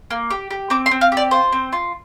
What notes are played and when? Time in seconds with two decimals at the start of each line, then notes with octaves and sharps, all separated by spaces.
0.11 A#3
0.30 G4
0.51 G4
0.70 C4 D6
0.86 C6
0.91 C4
1.01 F5
1.12 G4
1.17 D5
1.31 F4 C5
1.52 C4
1.73 F4